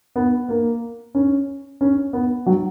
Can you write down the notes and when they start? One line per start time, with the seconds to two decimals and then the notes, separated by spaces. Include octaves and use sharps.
0.16 B3
0.49 A#3
1.15 C#4
1.81 C#4
2.13 B3
2.46 F#3